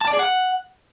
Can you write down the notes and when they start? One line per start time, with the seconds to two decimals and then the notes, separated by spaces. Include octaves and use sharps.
0.01 A5
0.07 D5
0.13 G#4
0.19 F#5